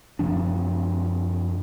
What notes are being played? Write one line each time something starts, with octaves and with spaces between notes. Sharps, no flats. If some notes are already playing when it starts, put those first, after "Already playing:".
F#2 C3 F3 D4